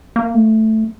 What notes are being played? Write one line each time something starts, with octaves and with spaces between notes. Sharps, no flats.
A#3
A3